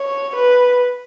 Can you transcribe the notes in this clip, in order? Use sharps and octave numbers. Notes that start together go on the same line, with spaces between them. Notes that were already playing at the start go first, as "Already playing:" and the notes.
Already playing: C#5
B4